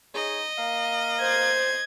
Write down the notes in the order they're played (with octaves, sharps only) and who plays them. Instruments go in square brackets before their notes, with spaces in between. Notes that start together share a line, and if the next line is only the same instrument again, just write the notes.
[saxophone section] D#4 G#4 C#5 [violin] D#5
[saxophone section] A#3 F5
[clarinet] C5 [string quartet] G#6